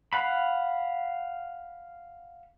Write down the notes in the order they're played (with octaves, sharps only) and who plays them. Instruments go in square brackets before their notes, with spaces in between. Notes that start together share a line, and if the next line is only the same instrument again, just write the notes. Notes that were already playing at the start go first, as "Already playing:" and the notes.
[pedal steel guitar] F5 F#5 B5